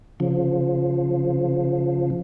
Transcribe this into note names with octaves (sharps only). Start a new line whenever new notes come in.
C#3 F3